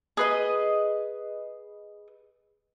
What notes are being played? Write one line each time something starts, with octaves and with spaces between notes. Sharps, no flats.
G#4 B4 D#5